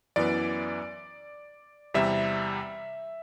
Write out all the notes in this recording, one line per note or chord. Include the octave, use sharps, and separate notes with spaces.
F#2 E3 B3 D5
E2 C3 G3 E5